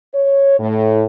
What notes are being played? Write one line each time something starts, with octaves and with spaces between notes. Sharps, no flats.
C#5
A2